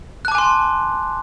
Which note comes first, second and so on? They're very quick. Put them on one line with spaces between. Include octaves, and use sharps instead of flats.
F#6 A5 D6 G#5 C6